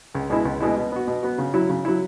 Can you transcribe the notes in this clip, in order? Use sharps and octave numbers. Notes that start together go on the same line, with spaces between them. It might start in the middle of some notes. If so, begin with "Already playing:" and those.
C#2
B2 G#3 E4
C#2
B2 G#3 E4
B2
B3 F#4
B2
B3 F#4
C#3
F#3 E4
C#3
F#3 E4